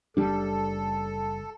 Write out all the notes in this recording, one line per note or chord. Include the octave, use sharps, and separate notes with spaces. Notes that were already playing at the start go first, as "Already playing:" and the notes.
F#1 G3 D4 A4